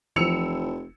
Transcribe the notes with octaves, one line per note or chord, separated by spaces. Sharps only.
F1 E3 F3 E6 C#7 F7